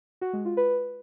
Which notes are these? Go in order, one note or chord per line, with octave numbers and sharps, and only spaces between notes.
F#4
G#3
F4
B4